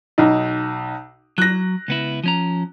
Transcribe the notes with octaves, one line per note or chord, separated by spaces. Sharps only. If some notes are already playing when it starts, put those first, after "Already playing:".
B1 D#4
F#3 F#6 A#6
C#2 B3 E4
F3 C#4 A#5